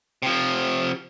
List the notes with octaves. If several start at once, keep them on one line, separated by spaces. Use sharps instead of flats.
C3 F3